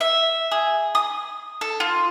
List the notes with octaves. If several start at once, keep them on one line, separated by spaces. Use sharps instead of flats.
E5
G#4
D#6
A4
F4